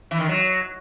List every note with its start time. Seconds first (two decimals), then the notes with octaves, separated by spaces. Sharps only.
0.11 E3
0.20 D#3
0.29 F#3